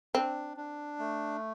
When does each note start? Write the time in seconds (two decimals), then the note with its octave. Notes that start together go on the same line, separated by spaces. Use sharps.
0.15 C4 D4
0.57 D4
0.99 A3